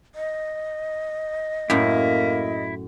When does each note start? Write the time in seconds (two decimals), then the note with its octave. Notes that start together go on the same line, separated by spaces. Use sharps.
0.15 D#5
1.70 F#2 A2 A#3 E4